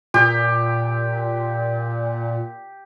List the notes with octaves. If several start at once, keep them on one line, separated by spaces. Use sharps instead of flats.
A#2 G4